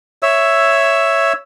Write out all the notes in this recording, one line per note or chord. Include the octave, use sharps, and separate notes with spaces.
C#5 E5 E6